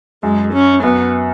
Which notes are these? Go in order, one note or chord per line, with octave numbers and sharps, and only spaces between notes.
F#2 G#3
C#4
F#2 B3